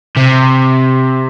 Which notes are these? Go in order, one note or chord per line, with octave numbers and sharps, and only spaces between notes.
C3